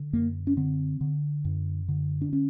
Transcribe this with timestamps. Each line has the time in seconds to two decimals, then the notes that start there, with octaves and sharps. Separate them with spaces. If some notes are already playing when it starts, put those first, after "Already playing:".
Already playing: D3
0.13 F#2 A#3
0.47 C#4
0.57 D3 C4
1.01 D3
1.45 F#2
1.88 D3
2.21 D4
2.33 C#4